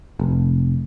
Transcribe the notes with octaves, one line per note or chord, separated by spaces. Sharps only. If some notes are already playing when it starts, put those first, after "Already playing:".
F1